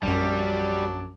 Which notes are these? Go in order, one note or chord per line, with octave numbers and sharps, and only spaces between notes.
A#1 F#2 F#3 G3 A5 D6